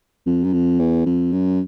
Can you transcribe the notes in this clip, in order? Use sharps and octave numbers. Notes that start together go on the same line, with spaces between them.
F2
F#2
F2
E2
F2
F#2